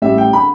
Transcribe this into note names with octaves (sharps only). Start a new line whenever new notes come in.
A1 A2 G3 E5
G5
D3 B5